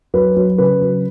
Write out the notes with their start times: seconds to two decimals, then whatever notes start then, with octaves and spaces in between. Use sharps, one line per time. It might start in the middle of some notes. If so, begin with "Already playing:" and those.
0.14 F#3 B4
0.36 F#3
0.58 C#3 B4
0.81 F#3